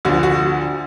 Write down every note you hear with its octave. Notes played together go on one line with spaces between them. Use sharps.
D2 D3 F3 F#4
F#4